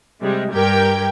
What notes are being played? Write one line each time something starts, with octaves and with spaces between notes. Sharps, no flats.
C3 G3 G#3
G2 G4 A#4 G5 G#6